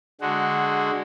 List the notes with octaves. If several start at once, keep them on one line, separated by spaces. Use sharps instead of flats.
D3 G#3 F#4